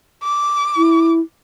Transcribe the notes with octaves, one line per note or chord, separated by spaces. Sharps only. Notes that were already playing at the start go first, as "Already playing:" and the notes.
D6
E4